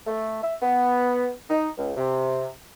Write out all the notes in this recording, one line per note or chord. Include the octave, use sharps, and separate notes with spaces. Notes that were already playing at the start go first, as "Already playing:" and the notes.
A3
E5
B3
D#4
C#2
C3